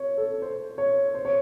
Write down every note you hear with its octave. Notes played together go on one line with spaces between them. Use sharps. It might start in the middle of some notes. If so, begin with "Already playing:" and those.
Already playing: C#5
A4
C5
C#5
C5
C#5